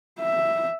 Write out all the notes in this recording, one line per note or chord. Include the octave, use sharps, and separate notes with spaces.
E5